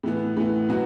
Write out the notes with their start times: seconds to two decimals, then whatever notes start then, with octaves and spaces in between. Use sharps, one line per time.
0.03 A2 E3 B3
0.37 A2 E3 B3
0.69 B2 F#3 B3 F#4